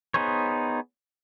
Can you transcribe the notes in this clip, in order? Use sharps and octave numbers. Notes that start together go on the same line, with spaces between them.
B3 D#4 G#4 C5 C#5